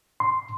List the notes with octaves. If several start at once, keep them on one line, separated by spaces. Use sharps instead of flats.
C6